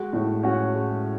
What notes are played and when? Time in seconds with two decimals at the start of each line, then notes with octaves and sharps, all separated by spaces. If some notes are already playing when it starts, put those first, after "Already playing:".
Already playing: G#3 F#4
0.13 A2
0.43 C#4 F#4
0.75 G#3